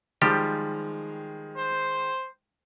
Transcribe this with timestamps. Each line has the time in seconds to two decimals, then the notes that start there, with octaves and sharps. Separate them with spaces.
0.22 D#3 F3 G3 G#3 G4
1.57 C5